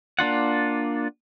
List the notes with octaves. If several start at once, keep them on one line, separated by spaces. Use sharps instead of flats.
A#3 D4 F4 F#5